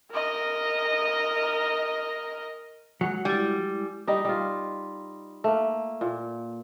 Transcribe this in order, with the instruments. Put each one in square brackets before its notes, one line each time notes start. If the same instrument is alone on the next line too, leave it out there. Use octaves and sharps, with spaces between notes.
[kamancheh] A#4 D#5
[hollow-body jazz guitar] F#3 [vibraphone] G#3 F#5
[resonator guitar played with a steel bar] G3 [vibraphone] G#3 E4
[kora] G3 D#4
G3 F4
A3 A#3
A#2